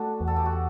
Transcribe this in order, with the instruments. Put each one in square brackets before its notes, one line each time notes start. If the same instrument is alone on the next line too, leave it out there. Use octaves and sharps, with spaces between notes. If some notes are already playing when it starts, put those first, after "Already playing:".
Already playing: [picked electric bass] A3 [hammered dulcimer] D4 F#4 A4
[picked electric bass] E2
[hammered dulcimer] A4
G4
F#4